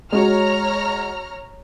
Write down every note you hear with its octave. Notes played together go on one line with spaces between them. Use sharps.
G#3 F#4 C#5 A#5 F6